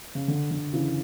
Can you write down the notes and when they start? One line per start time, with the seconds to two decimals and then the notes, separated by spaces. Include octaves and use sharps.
0.15 C#3
0.28 D3
0.51 D3
0.73 C#3 E3